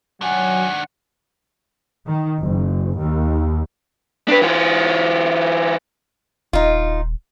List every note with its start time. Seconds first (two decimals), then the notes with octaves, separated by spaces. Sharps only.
0.22 D#3 F#3 D4 F#5 G#5
2.07 D#3
2.42 F#1
2.99 D#2
4.28 D4 B4
4.41 E3 F4
6.53 D#1 D#4 F4